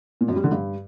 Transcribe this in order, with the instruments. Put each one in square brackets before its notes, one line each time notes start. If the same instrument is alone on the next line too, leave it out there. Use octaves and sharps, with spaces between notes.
[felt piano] A#2
F#2
G3
D3
G2